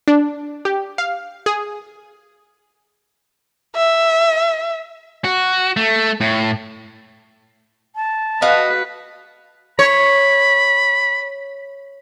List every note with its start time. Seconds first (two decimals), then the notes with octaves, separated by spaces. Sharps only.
0.08 D4
0.65 G4
0.98 F5
1.46 G#4
3.76 E5
5.24 F#4
5.77 A3
6.21 A2
7.96 A5
8.42 F#4 B4 D#5 F5
9.79 C#5 B5